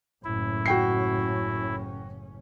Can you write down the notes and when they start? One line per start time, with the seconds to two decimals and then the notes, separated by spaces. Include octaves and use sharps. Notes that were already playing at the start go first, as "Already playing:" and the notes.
0.24 F#1 A2 C#4 E4
0.66 F#4 G5 C7